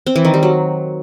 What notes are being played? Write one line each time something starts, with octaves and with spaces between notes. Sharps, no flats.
C4
E3
D#3
G3
F#3